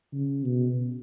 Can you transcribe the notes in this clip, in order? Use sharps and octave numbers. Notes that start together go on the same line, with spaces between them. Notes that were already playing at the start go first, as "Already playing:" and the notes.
C#3
B2